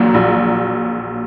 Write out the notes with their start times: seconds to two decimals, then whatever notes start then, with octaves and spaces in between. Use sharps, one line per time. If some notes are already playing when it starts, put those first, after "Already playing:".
Already playing: A#1 A#2 F#3
0.14 A#1